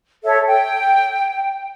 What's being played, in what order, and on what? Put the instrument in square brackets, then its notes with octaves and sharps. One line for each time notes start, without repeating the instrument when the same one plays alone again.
[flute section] A4 C#5 E5
G5